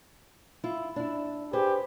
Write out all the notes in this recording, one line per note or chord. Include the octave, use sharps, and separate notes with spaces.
E4 F4
D4 E4
G4 G#4 B4 C5